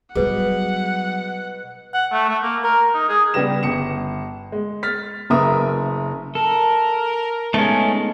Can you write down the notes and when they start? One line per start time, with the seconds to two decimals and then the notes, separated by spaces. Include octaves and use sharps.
0.15 B2 F#3 G3 G#4 B4 F#5
1.94 F#5
2.12 A3
2.29 A3
2.43 A#3
2.64 A#4
2.95 D#4
3.09 G#4
3.34 C#3 G3 B3 G4 A#6 E7
3.63 G1 C#7 E7
4.52 G#3
4.83 F6 A6 B6
5.30 F#1 F#2 A#4 B4 E5 D#6
6.35 A4 A#4
7.54 G#3 A3 B3 C#4 D#4